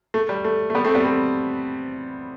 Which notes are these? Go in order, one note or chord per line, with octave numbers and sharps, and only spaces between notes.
A3
G3
A3
A3
G3 B3
A3 C4
G3 B3
A3 C4